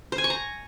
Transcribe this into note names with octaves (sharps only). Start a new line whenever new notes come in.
C5
G#5
C#6
A#5